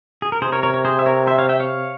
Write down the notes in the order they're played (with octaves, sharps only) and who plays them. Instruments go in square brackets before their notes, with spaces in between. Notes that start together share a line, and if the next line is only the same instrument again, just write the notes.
[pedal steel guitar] G#4
A#4
[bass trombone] C3 [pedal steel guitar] G#4 C5
[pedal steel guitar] A#4 C#5
A#4 C#5
A#4 C#5
G#4 C5
E5
A#4 C#5
C5 E5
C#5 F5
E5 G5
C#5 F5